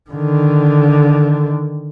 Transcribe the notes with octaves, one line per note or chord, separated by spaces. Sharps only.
D3 D#3